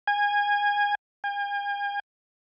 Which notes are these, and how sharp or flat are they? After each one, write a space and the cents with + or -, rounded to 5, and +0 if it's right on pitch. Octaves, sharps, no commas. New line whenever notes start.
G#5 -20
G#5 -45